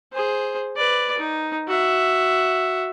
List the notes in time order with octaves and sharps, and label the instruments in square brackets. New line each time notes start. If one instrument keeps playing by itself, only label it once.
[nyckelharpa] G#4 C5
B4 D5
D#4
F#4 E5